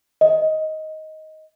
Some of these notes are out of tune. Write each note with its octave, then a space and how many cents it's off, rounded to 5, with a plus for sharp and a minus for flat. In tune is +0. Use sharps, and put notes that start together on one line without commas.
D#5 +10